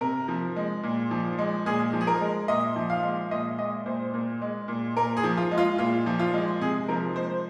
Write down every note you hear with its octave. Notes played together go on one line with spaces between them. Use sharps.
C3 A#4
F3
G#3
A#2
F3
G#3
A#2 G#4
F3
G#4
A#4
G#3
A#2 D#5
F3
F5
G#3
A#2 D#5
G#3 D#5
A#2 C5
A#2
G#3
A#2
A#2 A#4
G#4
F3
F4
G#3
F4
A#2 F4
F3
F4
G#3
C3 G#4
F3 A#4
G#3 C5